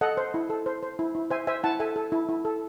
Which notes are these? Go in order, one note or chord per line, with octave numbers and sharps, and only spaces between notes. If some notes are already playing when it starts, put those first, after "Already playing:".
A4 D#5 F#5
C5
E4
A4
C5
C5
E4
E4
C5 E5 G#5
C5 E5 G#5
E4 F#5 A5
A4 E5 G#5
A4
E4
E4
A4